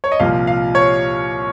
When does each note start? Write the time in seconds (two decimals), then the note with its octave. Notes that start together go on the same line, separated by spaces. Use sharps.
0.04 C#5
0.12 D#5
0.20 C2 A#2 F3 F5
0.47 F5
0.75 C#5